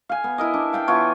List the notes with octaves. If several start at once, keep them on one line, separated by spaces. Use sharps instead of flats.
F5 G#5
B3
E4 A#4 D#5
D4
F5 G5 A5
E3 B3 F4 C#5